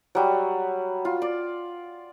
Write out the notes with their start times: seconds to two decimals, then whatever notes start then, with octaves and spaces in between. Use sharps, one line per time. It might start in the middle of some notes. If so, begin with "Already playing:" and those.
0.15 F#3 G3
1.05 F4
1.22 D5